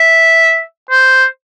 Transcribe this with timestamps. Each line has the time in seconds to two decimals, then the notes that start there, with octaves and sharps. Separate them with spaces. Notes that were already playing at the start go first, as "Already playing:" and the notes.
Already playing: E5
0.91 C5